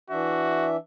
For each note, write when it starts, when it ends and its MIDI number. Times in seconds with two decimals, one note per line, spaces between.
0.11 0.77 52
0.11 0.77 62
0.11 0.71 66
0.11 0.77 76